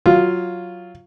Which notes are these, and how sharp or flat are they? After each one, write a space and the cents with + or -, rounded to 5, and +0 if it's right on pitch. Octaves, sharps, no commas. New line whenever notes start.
F#3 +0 F4 +0